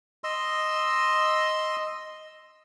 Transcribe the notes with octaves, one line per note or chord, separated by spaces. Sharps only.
D#5 C6 E6